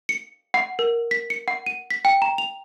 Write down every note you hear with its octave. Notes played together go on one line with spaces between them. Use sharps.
C#7
F#5
A#4
B6
C#7
F#5
D#7
B6
G5
A#5
F7